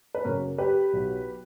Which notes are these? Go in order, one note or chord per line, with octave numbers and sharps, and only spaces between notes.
B4
F#2 C#3 F#3 A#3 A#4 C#5
G4 B4
B1 B2 F#3